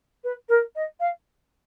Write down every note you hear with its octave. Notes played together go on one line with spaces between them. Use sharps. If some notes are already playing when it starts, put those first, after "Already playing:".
B4
A#4
D#5
F5